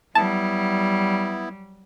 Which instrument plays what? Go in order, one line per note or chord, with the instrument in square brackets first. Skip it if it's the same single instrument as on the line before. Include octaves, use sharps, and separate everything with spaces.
[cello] F#3 G3 [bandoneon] B3 E4 [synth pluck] A5